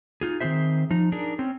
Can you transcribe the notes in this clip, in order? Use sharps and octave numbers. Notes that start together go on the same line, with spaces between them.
D#4 F4 G#4
D#3 C4 C#4 G#4 C5 E5
F3 D#4
D4 D#4 G#4 A#4
C4 C#4